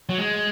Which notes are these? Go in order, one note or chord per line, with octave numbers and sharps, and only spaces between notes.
F#3
G#3